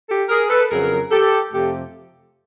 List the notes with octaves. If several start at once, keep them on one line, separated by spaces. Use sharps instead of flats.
G4 A4
G#4 A#4
A4 B4
F2 C#3 F#3 G#4 A#4
G4 A4
F2 C3 F3 A3 G4 A4